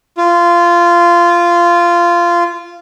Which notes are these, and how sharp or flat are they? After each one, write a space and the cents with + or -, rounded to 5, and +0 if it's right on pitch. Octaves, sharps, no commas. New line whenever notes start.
F4 -15